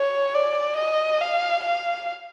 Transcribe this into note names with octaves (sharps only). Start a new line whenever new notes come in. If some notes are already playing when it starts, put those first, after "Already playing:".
Already playing: C#5
D5
D#5
F5
F5